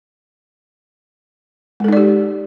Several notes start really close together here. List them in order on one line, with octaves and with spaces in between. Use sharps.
G#3 A4 D#4 D5 G4